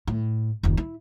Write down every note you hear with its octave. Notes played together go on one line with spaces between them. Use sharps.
A2
F1 D#2
E4